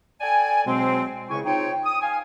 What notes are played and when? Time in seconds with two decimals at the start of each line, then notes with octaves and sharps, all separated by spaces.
0.21 A4 D5 G5 G#5
0.66 G#2 B2 F#3 G#3 C4
1.30 C#2 C#3 G#3 E4 G#5 C#6
1.45 C4 D#4 F4 G#4 C#5 G5
1.84 D#6
2.02 F5 G#5